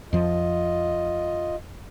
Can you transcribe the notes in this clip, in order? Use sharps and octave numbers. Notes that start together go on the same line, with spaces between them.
F2 F3 F4 D#5